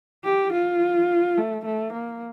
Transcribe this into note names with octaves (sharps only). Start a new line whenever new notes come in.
G4
F4
A3
A3
A#3